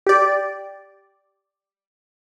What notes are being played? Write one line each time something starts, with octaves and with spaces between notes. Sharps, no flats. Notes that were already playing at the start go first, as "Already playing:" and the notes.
G4 D5